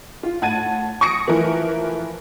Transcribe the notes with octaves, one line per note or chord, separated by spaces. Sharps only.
F4
A2 F#5 A5 G#6 A6 D#7
C#6 D#6 A#6 C#7 D7
E3 F3 A3 E4 A#4